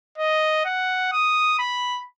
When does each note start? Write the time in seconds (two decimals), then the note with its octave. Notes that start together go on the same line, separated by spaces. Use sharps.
0.18 D#5
0.65 F#5
1.12 D#6
1.59 B5